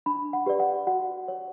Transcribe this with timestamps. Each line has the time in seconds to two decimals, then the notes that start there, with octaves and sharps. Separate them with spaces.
0.06 D4 B5
0.33 F#5
0.46 G4 B4 D5
0.60 F#5
0.87 F#4 F#5
1.28 C#5